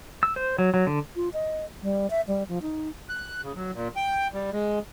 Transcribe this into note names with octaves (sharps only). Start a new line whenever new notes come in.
E6
C5
F#3
F#3
D3
F4
D#5
G3
E5
G3
F3
D#4
F#6
C#3
F#3
A#2
G5
G3
G#3